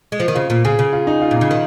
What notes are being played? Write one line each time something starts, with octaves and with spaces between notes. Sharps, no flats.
G#3
F3
D#3
C#3 F4
A#2
C#3 G#4
C#3
F4
D#4
F4
A#2
C#3 D#4
D#3